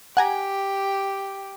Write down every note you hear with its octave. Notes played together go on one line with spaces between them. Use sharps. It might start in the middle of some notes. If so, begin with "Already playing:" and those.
G4 F#5 G#5 A#5